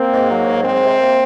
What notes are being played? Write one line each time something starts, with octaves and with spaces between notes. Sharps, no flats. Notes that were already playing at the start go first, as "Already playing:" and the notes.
Already playing: A#3 C4
G#2
F#3
G#2
G#3 C4
C3
A#3